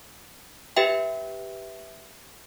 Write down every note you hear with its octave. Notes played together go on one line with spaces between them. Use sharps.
G4 B4 E5 G5